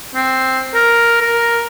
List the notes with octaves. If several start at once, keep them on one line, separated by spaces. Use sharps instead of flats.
C4
A#4
A#4